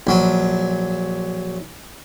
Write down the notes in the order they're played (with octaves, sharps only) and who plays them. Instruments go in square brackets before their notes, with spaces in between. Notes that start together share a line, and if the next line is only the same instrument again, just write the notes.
[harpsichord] A#1 F#3